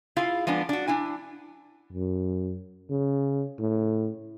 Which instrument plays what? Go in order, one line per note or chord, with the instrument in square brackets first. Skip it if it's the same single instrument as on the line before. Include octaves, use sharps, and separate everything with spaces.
[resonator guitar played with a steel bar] E4 F4 G#4 F5
F3 G#3 B3 D4
D4 F#4
D4 E4 G#5
[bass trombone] F#2
C#3
A2